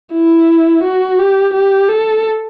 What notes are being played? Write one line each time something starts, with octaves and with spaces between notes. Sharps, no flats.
E4
F#4
G4
G4
A4